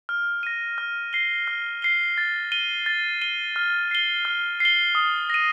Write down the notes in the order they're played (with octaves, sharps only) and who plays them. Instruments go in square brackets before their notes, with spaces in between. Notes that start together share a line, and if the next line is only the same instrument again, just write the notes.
[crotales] F6
A#6 D#7
F6
C7 G7
F6
C7 G7
A6
D#7 G7
A6
D#7 G7
F6
C7 G7
F6
C7 G7
D#6
A#6 D#7